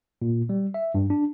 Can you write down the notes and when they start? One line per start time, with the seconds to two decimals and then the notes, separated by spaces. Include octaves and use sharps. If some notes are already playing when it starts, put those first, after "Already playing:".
0.22 A#2
0.49 G3
0.74 E5
0.94 G2
1.10 D4